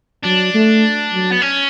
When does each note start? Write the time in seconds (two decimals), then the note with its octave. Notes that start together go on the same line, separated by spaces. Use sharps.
0.24 F#3 D4
0.54 A3
1.13 F#3
1.32 B3
1.42 C#4